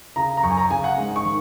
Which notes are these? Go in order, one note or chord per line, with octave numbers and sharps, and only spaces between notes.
C#3 A#5
A#5
F#2 C#6
G#5
A#5
C#3 G#5
F#5
G#2
C#6
D#3